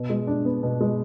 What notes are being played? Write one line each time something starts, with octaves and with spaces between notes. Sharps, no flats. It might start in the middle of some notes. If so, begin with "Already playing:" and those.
Already playing: B2
G#3
D4
B3
B2
G#3